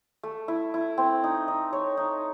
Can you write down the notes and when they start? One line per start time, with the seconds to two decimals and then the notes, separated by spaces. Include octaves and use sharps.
0.23 A3
0.48 E4
0.74 E4
0.98 C4
1.24 D#4
1.48 D#4
1.73 C#5
1.97 D#4